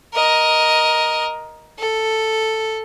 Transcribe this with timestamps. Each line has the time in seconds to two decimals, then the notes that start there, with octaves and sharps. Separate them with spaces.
0.14 A#4 D#5
1.79 A4